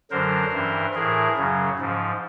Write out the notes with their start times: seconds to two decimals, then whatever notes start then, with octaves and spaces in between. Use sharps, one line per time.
0.11 F#2 D3 F#3 A#4 C5
0.52 G2 E3
0.95 A2 E3 G#4 A#4
1.37 F#2 C#3 F#3
1.79 G#2 F3